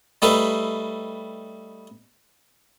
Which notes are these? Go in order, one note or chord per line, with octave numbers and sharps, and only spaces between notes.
G3 A3 D#4 B4 E5 F5